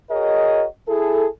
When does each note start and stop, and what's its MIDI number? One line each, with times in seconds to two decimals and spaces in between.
0.10 0.65 66
0.10 0.65 68
0.10 0.65 70
0.10 0.65 73
0.10 0.65 75
0.89 1.27 64
0.89 1.27 68
0.89 1.27 69